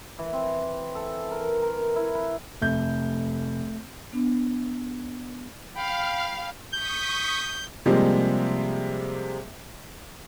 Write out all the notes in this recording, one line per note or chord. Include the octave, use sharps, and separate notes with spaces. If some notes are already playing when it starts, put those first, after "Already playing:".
E3
C4
A4
A#4
A#4
E4
B4
F1 A3 G6
B3 D4
F5 G5 B5
C#6 D#6 G6 B6
C3 F3 G3 G#3 A#3